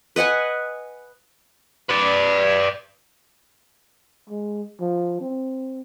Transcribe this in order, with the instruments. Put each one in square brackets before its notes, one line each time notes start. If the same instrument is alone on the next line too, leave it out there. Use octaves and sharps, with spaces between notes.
[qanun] B4 D#5 F#5 G#5
[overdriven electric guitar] B4 D5
[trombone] G#3
F3
C4